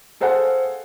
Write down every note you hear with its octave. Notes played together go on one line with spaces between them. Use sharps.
G#4 A4 C5 F5 F#5 G#5